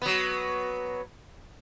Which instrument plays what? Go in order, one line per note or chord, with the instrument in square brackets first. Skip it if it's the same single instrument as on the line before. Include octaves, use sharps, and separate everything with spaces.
[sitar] F#3 B3